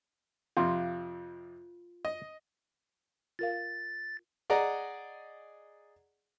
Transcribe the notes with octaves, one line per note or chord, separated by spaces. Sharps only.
F2 C3 F4
D#5
F4 A#4 F5 A6
G#4 D5 D#5 F#5 A#5